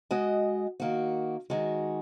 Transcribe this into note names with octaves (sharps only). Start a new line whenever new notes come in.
G#3 F#4 D#5
D#3 A#3 F#4
D#3 G#3 F#4